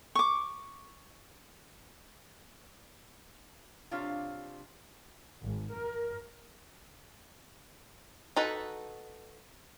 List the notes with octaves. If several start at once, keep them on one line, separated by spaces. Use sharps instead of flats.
C#6 D6
C3 D4 F4 C#5 F5
G#1
A#4
D#4 F#4 A4 B4